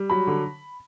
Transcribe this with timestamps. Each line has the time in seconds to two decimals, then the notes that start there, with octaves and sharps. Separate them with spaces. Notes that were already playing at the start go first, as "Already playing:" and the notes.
Already playing: G3
0.10 F#3 B5
0.27 D3